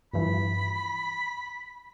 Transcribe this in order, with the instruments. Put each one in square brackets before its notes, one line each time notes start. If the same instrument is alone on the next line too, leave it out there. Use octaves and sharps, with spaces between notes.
[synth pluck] G2 E3 F3 [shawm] B5